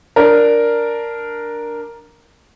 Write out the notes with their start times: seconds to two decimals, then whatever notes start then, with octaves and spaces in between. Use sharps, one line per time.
0.16 D4 A#4